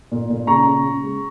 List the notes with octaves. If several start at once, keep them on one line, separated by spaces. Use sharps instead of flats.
A#2
A#2
C#3 A#5 C#6
C#3
C#3
G#3